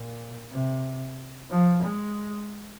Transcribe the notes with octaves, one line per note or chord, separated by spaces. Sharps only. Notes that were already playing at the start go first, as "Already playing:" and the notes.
Already playing: A#2
C3
F3
G#3